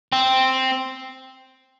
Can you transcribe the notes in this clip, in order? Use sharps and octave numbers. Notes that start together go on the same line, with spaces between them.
C4